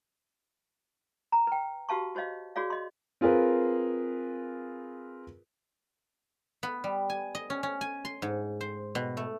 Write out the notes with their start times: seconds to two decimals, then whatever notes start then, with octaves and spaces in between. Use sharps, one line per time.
1.32 A#5
1.47 B4 G5
1.89 F#4 G4 B4 F5 A5 C#6
2.15 F#4 C5 C#5 D#5 F5
2.56 F#4 G#4 C#5 D5 F5
2.70 D#5 C6
3.21 C4 F4 G#4 A#4 B4
6.63 B3
6.84 G3
7.10 G#5
7.35 D#5
7.50 C#4
7.63 C#4
7.81 G#5
8.05 C6
8.22 G#2
8.61 C5
8.95 B2
9.17 A3